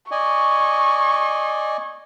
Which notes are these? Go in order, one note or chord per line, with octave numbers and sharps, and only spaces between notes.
D5 D#5 G#5 C#6